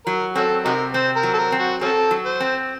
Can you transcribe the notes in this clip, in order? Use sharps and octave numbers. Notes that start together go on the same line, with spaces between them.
F#3 A#4
C4 C#4 F#4 A4
C3 D#4 F#4 A#4
C4 C5
A#4
F#3
A4
A#4
C4
F#4
C4 C#4 F#4 A4
F#3
C5
C4